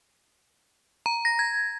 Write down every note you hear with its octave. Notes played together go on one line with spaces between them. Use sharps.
A#5
A#6
G#6